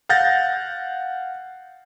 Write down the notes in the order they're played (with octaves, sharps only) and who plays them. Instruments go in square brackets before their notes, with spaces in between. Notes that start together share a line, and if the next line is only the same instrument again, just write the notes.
[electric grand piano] F5 F#5 G6 A6 A#6